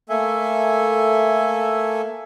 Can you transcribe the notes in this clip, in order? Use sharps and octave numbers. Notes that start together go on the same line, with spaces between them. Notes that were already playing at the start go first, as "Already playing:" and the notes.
A3 A#3 A4 E5 G#5